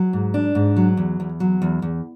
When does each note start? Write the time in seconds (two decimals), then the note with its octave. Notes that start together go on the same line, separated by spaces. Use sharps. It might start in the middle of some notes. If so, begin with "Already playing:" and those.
Already playing: F#3
0.13 G#2
0.34 D4
0.55 G#2
0.77 F#3
0.97 E2
1.20 E2
1.40 F#3
1.62 E2
1.82 E2